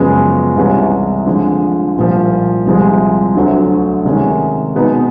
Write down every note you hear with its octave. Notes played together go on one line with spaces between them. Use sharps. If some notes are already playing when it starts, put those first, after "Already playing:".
Already playing: F#2 C#3 F3 G#3 B3
C2 C3 E3 G#3 C#4
D3 F3 G#3
C2 A#2 F3
C2 C3 F3 G#3
D2 D3 F#3 A3
C3 D#3 G#3 C#4
B2 G#3 B3 D#4